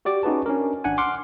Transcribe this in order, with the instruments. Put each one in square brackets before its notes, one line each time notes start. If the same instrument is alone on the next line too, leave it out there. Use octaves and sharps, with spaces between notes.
[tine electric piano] F#4 G4 D5 D6
C#4 D#4 F#4 G#4 B4 A5
C#4 D4 A#4
G#1 D4 F#5 G#5
F#5 C6 D6 F6